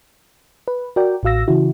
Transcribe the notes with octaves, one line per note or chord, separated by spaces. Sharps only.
B4
F#4 A#4 D5 G5
A1 A2 F#4 F5 E6 A#6
C#3 E3 E4 F#4